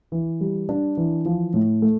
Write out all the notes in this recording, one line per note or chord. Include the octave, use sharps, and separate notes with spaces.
E3
G3
D4
E3
F3
A2
A3